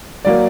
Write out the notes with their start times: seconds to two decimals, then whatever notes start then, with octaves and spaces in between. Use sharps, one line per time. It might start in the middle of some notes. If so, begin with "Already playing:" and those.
0.25 F#3 A#3 D5